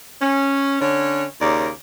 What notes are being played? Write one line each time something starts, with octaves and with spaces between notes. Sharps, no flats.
C#4
D3 C#4 C#5
D#2 C#3 A#4 D5